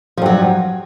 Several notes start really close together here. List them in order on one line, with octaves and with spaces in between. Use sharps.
F3 G2 F#3